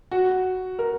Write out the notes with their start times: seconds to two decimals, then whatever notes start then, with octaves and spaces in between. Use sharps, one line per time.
0.11 F#4
0.79 A#4